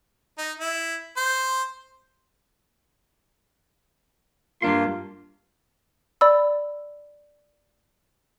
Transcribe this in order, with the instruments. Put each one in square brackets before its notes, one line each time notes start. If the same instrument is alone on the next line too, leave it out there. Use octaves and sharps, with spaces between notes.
[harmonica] D#4
E4
C5
[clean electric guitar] G2 D4 C6 [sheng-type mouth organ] A#3 F4
[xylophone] D5 B5 E6